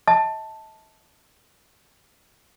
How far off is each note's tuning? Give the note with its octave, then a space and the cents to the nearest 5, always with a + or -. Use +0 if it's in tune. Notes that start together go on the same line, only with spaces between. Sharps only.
D#5 +45 A5 +0